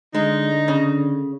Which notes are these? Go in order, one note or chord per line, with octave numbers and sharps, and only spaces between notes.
D3 G#3 D#4
C#3